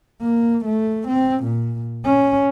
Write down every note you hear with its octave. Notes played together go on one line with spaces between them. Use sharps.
A#3
A3
C4
A#2
C#4